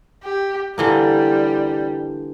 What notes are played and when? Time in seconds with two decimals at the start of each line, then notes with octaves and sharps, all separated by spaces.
0.24 G4
0.78 D3 E3 G3 A#3